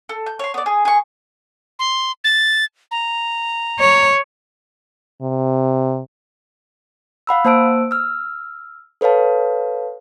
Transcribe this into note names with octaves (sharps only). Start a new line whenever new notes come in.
A4
G6
C#5 C6
B3 D5
G#4
G#4 C#6
C6
A6
A#5
C#5
C3
F5 F#5 B5 E6
A#3 C5 A5 E6 D7
E6 F6
A4 B4 C#5 F5 A5